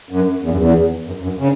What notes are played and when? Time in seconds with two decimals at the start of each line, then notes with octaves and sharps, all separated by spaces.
0.10 F#2
0.42 E2
0.49 F#2
0.57 E2
1.06 F#2
1.23 F#2
1.39 C#3